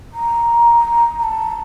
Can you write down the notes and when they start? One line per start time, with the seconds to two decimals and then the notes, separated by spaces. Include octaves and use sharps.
0.13 A#5
1.19 A#5
1.23 A5